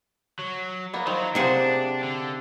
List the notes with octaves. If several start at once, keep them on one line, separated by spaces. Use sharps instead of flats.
F#3
A#3 B3
D#3 F3 F#3
C3 A#3 D4 G#4 C5 F#5
D3